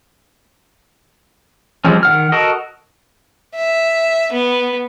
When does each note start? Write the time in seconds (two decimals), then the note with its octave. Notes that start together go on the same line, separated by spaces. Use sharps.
1.85 F3 G3 G#3 C4 C#4
2.03 D#3 F#5 F6
2.32 F#4 A4 A#4 D#5
3.56 E5
4.33 B3